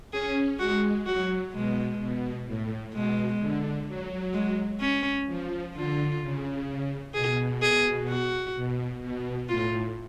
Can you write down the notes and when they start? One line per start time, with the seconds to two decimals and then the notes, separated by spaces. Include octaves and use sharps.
0.12 C#4 G#4
0.59 G#3 F#4
1.06 F#3 F#4
1.53 B2 G#3
2.00 B2
2.46 A2
2.93 B2 G#3
3.40 D3
3.87 F#3
4.33 G#3
4.81 C#4
5.27 F3
5.74 D3 F4
6.22 C#3
7.14 B2 G#4
7.62 G#4
8.08 F#4
8.56 B2
9.02 B2
9.49 A2 F4